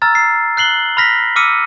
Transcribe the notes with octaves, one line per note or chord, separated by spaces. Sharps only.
A#5 E6 F6 G#6 A6
C7
F#6 C7 F#7 G7
B5 F6 A#6 B6
D6 E6 F6 B6 C#7 D#7